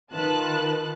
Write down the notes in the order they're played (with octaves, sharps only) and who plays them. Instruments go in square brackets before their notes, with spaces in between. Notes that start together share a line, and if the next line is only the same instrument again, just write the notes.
[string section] D#3 F4 B4 A5 F#6